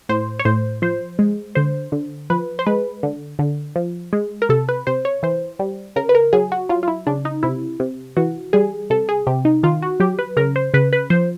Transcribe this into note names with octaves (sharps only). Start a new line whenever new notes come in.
A2 C5
C#5
A2 C5
F3 C5
G#3
D3 C5
D3
F3 B4
C5
G#3 B4
D3
D3
F3
G#3
A#4
C3 A4
B4
C3 C5
C#5
E3 C5
G3
C#3 A#4
B4
A#4
F#3 G#4
F#4
F#3 F4
F4
E4
C#3 D4
D#4
C3 E4
C3
E3 F#4
G3 G#4
C3 A4
G#4
C3 G4
D#4
D#3 F4
F#4
F#3 G4
B4
C#3 A#4
C5
C#3 B4
B4
F3 C5